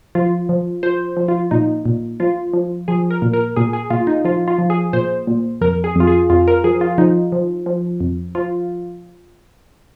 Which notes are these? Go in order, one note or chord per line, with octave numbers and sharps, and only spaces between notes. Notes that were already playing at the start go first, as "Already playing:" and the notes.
F3 F4
F3
F3 C5
F3
F4
A#2 D#4
A#2
F3 F4
F3
F3 G#4
A#4
A#2
A#4
A#2 G#4
G#4
A#2 F4
D#4
F3 F4
F4
F3
G#4
A#2 C5
A#2
F2 A#4
G#4
F2 F4
G#4
F2 F4
A#4
F3 G#4
F4
F3 D#4
F3
F3
F2
F3 F4